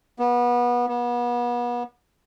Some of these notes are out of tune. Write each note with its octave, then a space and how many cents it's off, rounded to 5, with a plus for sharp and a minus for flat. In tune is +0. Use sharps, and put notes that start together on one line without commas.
B3 -25
B3 -35